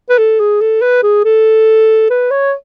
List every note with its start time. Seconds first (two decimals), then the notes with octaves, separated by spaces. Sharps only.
0.09 B4
0.18 A4
0.39 G#4
0.61 A4
0.82 B4
1.03 G#4
1.25 A4
2.10 B4
2.31 C#5